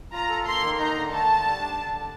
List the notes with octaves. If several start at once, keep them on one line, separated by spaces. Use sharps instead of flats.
F4 A#5
A4
A#3 C6
D#3
D#4 A#5
D3
A3 A5
D3
G3
D4
D3